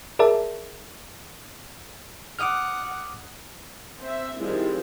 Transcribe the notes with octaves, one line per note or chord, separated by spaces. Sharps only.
G#4 A#4 D5 E5 A5
F#5 D6 D#6 F6
C4 C5 E5
D#3 F3 G3 G#3 C4 E4